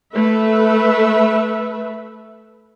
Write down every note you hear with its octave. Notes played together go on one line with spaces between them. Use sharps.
A3 B4 E5